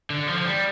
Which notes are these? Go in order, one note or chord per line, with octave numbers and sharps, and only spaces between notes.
D3
F3
F3
G3